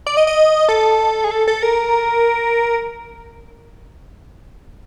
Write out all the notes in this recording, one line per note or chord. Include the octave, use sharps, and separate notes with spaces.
D5
D#5
D#5
A4
G#4
A4
A4
A#4